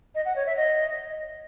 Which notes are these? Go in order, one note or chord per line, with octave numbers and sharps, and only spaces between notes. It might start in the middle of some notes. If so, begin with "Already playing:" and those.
D#5
F#5
C#5
E5
D#5